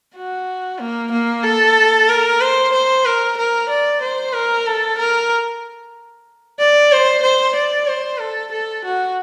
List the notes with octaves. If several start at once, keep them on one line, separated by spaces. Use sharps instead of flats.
F#4
A#3
A#3
A4
A#4
C5
C5
A#4
A#4
D5
C5
A#4
A4
A#4
D5
C5
C5
D5
C5
A4
A4
F#4